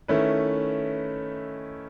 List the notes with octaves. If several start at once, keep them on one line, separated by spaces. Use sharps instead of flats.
D#3 A3 C#4 E4 B4